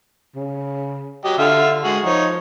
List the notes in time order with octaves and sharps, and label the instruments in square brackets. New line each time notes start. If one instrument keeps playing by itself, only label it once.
[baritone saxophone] C#3
[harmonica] F#3 G4 D#5
[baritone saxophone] D3 [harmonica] F4 E5 F5
[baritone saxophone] G#3 [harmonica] F#4 G#4
[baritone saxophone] F3 [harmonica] D#4 C#5